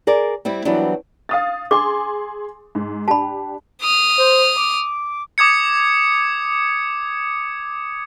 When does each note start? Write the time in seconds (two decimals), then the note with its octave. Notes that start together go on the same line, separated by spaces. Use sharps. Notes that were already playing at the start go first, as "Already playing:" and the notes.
0.07 G#4 A#4 D5
0.45 G3 C4 E4
0.65 E3 F#3 G3 B3 C4 D4
1.29 F5 D#6 A6
1.71 G#4 G#5 C6 D6
2.75 G#2
3.08 D4 G4 A5 B5
3.82 D#6 F6
4.18 C5
4.57 D6
5.38 D6 D#6 G#6 C#7